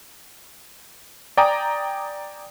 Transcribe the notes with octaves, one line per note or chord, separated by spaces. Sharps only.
D5 G5 G#5 A#5 D6 D#6